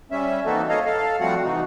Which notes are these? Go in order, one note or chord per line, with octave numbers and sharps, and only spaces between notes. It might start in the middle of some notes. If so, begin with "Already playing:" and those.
G3 C#4 E5
E3 A#3 C4 D#4 F#4 A4
A4 C#5 D#5 F5 A#5
A4 F5
F3 G3 A3 C4 F#4 F#5
C3 E3 D#4 F#4